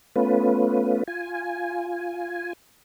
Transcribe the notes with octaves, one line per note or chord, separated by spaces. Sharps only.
A3 B3 C#4 F4 B4
F4 G#5